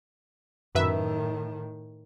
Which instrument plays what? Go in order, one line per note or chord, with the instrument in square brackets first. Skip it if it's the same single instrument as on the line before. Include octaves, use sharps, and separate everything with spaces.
[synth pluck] F#2 B4 E5 [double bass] A2 D#3